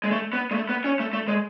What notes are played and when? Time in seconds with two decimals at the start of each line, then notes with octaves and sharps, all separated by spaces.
0.04 G#3
0.11 A3
0.33 B3
0.51 G#3
0.54 A3
0.69 B3
0.84 C#4
1.00 A3
1.13 A3
1.28 G#3